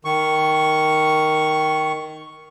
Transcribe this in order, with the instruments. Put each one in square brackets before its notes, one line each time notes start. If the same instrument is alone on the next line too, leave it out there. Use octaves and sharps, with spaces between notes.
[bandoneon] D#3 C#6